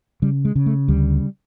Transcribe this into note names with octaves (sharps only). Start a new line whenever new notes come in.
C#3 G3
G#3
C#3
A3
D2 G3